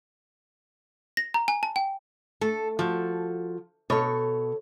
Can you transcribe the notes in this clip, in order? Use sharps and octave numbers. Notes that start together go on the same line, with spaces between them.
A#6
A#5
G#5
A5
G5
A3 A4
F3 F#4 A4
B2 A4 C#5